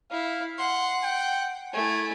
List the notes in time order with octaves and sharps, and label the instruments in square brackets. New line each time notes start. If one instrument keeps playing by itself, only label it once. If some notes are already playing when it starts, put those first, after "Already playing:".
[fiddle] E4 [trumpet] F5
[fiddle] F#5 [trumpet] C6
[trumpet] G5
[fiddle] A3 E4 [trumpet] G#5